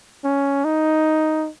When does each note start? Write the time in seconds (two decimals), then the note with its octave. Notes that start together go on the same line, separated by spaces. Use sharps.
0.24 C#4
0.65 D#4